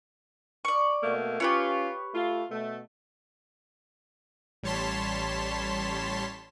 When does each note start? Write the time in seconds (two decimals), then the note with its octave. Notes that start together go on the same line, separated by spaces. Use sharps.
0.65 D5 C#6
1.03 B2 A3 A#3
1.40 C#4 F4 G4 B4 C#5
2.14 A3 F4
2.51 B2 A3
4.63 A1 G3 C#5 A5 C6 B6